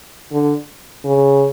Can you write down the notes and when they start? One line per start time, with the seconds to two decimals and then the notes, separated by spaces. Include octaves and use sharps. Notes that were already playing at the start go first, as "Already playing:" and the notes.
0.33 D3
1.05 C#3